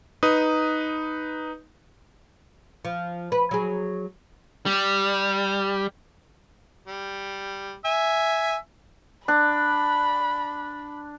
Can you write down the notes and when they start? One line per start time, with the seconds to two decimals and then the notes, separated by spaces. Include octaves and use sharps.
0.23 D#4 B4 D#6
2.85 F3
3.32 B4
3.51 F#3 G#4
4.66 G3
6.87 G3
7.85 E5 G#5
9.28 D4 B5